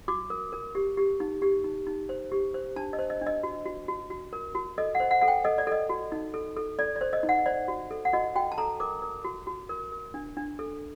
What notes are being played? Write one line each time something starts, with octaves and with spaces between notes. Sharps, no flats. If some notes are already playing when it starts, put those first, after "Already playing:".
F#4 D6
A#4
A#4
G4
G4
D#4
G4
D#4
D#4
C5
G4
C5
D4 A5
D#5
C5
D#5
D4
D#5
F#4
F#4
F#4
F#4
A#4
F#4
A4 D#5
F#5
C5
F#5
A4 F#5
G5
A4 D#5
D5
A4 D#5
F#4
D#4
A4
A4
A4 D5
D5
C5
D#5
D#4
F#5
C5 D5
F#4
A4
F#5
F#4 D#5
F#4 G5
A5
A4 A#5
A#4 D6
A#4
F#4
F#4
A#4
A#4
D4
D4
A4